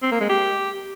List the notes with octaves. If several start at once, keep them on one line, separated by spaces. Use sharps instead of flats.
C4
A#3
G#3
G4